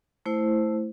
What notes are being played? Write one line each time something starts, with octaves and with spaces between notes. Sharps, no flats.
A3 E4 C5